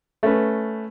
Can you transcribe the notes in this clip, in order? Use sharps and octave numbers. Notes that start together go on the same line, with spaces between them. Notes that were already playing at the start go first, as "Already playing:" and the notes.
A3 C#4 B4